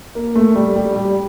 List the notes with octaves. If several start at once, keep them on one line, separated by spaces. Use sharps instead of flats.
A#3
A3
G3
G3
G3